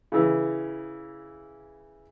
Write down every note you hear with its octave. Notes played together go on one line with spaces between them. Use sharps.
C#3 E3